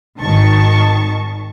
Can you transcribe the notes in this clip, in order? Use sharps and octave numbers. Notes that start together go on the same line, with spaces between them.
G#1 D#3 A5 C#6